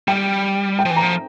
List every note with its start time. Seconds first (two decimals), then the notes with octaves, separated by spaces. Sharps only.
0.08 G3 G5
0.79 G5
0.85 F3
0.91 E3
0.96 A#5
1.02 F3